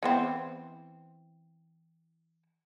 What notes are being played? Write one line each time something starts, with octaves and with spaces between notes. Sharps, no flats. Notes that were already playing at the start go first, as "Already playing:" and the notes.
E3 B3 C4